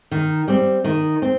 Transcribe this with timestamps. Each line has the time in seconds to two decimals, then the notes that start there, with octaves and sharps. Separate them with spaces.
0.11 D#3
0.48 G3 C4
0.84 D#3
1.22 C4